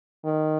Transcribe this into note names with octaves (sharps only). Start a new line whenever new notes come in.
D#3